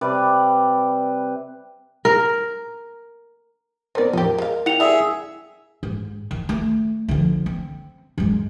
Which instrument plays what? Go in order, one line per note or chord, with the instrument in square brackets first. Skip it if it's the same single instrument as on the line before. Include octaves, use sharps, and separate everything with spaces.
[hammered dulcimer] C3 G3 B4 D5
[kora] A#4
[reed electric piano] B3 A#4 C5 [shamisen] D#4 D5
[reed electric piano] E2 A2 F3 [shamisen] D#4 G4
[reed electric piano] A#4
[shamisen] G#3 F5
[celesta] E4 C#7 F7 [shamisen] F#5 G5
[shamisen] D3 G3 [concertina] G#4 E5
[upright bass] G#2
D#3
A3
D3 F3
C4
F#2 G#3